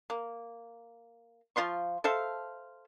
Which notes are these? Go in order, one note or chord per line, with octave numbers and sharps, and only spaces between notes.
A#3
F3 F4 C6 C#6
A4 C5 E5 F5